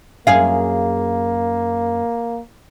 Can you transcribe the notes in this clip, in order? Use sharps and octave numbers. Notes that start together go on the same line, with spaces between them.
F#2 A#3 G#4 F5